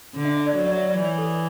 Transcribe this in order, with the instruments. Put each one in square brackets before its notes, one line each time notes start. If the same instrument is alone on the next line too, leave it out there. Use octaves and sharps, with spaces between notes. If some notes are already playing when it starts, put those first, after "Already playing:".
[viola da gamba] D3
[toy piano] E5
E5
D5
[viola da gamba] F#3 [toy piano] C#5
[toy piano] D5
E5
D5
[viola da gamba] E3 [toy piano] C#5
[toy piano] A4